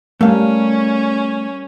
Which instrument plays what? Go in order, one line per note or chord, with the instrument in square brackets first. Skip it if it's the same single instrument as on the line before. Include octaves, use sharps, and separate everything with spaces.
[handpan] G3 A#4 [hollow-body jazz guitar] A3 F5 [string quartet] C#4